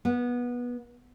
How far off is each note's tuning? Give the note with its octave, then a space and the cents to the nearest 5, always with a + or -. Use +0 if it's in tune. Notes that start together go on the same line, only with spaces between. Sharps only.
B3 -20